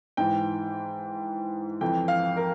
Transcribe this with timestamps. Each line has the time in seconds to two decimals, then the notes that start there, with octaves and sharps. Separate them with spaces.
0.17 G#2 E3 G5
1.81 F2 E3 G5
2.08 F5
2.37 A#4